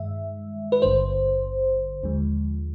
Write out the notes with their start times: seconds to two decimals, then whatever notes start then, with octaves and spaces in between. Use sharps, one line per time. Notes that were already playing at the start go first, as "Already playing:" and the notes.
Already playing: G2 D#3 G#3 E5
0.72 B4
0.82 G#1 G2 D3 C5
2.03 D#2 D3 F3 G#3